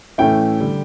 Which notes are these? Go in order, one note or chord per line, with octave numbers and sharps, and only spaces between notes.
A2 E3 A3 C#4 E4 G5
D3 G3